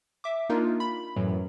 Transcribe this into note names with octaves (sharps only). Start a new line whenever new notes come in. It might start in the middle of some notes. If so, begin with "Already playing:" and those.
E5 D6
A#3 D4 D#4 F4 A#4
B5
F#2 A2 E3 F#3